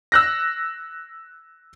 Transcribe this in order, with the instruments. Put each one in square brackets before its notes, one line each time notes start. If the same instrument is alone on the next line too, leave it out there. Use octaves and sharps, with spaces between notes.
[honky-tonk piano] E6 F#6 A#6